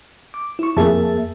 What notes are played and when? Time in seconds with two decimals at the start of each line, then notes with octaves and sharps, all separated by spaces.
0.34 D6
0.59 E4 C#6
0.77 F2 A#3 G#4 E5 A5